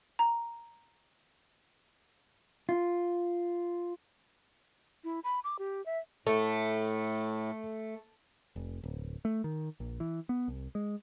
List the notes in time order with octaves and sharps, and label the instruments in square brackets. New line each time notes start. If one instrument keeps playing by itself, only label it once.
[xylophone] A#5
[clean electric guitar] F4
[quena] E4
B5
D6
G4
E5
[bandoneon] A2 [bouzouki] A3 [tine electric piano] A4
[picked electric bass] F1
D1
A3
D#3
A#1
E3
B3
C2
G#3